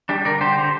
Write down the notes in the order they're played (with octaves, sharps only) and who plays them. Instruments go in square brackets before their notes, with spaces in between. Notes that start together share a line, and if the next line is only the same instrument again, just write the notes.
[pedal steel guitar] G3 D4 G4
D3 A#4 D5
D3 G4 C5
D3